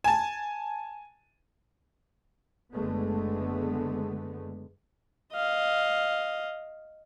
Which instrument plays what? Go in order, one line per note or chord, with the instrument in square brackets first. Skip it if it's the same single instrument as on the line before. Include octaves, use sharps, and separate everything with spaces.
[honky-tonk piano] G#5 A5
[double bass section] F#1 D3 G#3 A3 B3
[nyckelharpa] D#5 F5